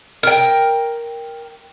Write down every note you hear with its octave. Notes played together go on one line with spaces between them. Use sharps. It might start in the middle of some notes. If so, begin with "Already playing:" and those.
A#4 G5